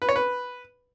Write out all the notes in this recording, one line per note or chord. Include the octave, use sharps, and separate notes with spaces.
B4
C#5
B4